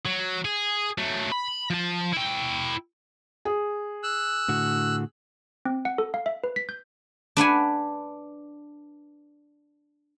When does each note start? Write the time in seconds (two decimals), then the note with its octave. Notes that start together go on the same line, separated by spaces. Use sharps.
0.05 F#3
0.45 G#4
0.98 F#3 A3
1.32 B5
1.70 F3 A5
2.13 E4 G5
3.45 G#4
4.03 E6 F#6
4.48 A2 D3 F#4
5.66 C4
5.85 F#5
5.98 A4
6.14 F5
6.26 E5
6.44 B4
6.56 B6
6.69 G6
7.37 D4 B4 F#5 G#5